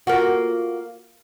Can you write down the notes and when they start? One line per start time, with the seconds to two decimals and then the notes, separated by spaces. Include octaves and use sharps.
0.07 A#3 F4 F#4